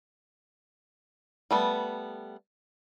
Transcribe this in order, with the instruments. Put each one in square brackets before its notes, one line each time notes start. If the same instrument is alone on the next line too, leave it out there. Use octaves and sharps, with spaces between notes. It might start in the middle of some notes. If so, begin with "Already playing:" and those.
[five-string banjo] G3 A3 B3